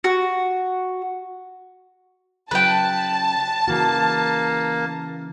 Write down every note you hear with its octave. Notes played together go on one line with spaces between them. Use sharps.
F#4
C#3 F#3 E4 B4 G5 A5
C#3 E3 A#3 F#4